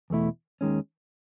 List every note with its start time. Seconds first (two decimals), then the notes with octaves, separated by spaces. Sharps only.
0.10 E2 B2 A3 E4
0.61 D#2 D#3 G#3 C#4